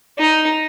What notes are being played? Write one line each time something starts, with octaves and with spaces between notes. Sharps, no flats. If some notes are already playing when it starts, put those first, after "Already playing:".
D#4